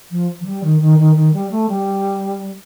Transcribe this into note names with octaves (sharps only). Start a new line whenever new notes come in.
F3
F3
G3
D#3
D#3
D#3
D#3
G3
A3
G3